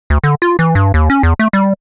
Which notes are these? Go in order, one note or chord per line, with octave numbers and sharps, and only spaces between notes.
D2
D3
F4
E3
G2
D#2
C#4
E2
A3
G3